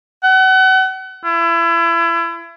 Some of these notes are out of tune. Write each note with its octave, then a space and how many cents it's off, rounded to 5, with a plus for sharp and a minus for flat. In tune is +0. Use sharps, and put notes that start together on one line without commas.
F#5 +35
E4 +30